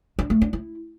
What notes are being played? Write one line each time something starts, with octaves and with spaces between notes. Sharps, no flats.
D4
A3
D4
E4